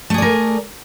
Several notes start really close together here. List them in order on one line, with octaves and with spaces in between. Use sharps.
A3 G#4 D5 A#4